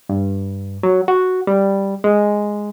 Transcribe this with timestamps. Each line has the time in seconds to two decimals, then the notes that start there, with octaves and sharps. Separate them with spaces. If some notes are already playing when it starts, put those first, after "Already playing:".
0.09 G2
0.83 F#3
1.08 F#4
1.47 G3
2.04 G#3